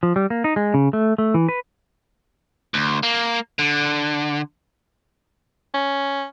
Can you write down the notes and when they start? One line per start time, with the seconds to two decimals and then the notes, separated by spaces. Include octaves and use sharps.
0.03 F3
0.16 G3
0.30 A#3
0.44 D#4
0.56 G#3
0.74 C#3
0.93 A3
1.18 A3
1.34 E3
1.49 B4
2.74 D2
3.03 A#3
3.59 D3
5.74 C#4